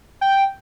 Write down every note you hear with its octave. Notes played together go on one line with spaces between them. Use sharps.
G5